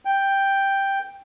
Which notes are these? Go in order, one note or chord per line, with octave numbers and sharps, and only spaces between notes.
G5